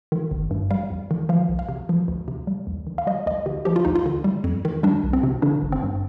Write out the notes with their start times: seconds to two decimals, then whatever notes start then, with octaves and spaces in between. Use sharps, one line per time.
0.12 D#3
0.31 G1
0.51 G2
0.71 G3 F5
0.90 F2
1.11 D#3
1.29 F3 F5
1.49 C2
1.59 F5
1.69 C3
1.89 F3
2.08 D2
2.28 C3
2.47 G3
2.67 D#2
2.87 D#3
2.98 F5
3.07 G3 D#5
3.26 D2 D#5
3.46 D3 G4
3.65 F3 G4
3.76 F4
3.85 D2 D#4
3.95 F4
4.06 D3
4.24 G3
4.44 F2
4.65 D#3
4.83 G3 D4
5.03 C2
5.13 C4
5.23 C3
5.42 D3 D4
5.62 G1
5.72 C4
5.83 G2